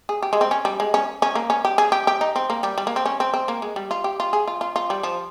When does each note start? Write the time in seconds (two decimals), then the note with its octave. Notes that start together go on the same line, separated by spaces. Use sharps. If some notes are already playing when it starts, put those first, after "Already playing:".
0.09 G#4
0.22 G4
0.33 G#3
0.41 C4
0.51 C#4
0.65 G3
0.80 G#3
0.94 C#4
1.22 C#4
1.35 A#3
1.50 C#4
1.65 G4
1.78 G#4
1.92 G4
2.07 G4
2.21 D#4
2.36 C4
2.50 A#3
2.63 G3
2.78 G3
2.87 A#3
2.96 C4
3.05 C#4
3.20 C4
3.34 C4
3.48 A#3
3.62 G#3
3.76 G3
3.91 F4
4.04 G4
4.20 F4
4.33 G#4
4.48 F4
4.61 F4
4.76 F4
4.90 G3
5.03 F3